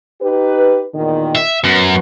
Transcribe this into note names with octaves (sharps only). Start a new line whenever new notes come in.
D#4 G4 B4
E2 A#2 D#3
E5
F#2 F#3 B3